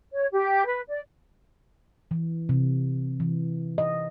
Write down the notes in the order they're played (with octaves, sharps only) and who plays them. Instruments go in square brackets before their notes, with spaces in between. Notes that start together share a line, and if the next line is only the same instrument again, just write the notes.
[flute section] C#5
G4
B4
D5
[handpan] E3
C3
E3
D#5